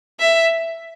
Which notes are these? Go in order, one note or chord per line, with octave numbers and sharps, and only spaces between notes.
E5